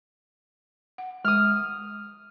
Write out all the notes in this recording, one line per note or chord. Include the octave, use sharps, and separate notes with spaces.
F#5
G#3 D#6 F6